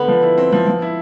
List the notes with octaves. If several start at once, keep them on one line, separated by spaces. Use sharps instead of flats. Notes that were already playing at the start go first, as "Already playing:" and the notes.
Already playing: D3 B3
F3
E4
C4
F3
F3
E4